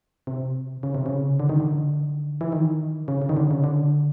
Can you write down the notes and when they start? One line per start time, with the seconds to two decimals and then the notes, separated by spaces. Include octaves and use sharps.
0.27 C3
0.83 C#3
0.95 C3
1.06 C#3
1.40 D3
1.49 D#3
1.60 D3
2.41 E3
2.52 D#3
3.08 C#3
3.22 C#3
3.29 D#3
3.37 D3
3.51 C#3
3.64 D3